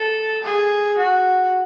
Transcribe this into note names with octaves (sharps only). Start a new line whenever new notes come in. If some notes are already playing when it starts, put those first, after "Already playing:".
Already playing: A4
G#4
F#4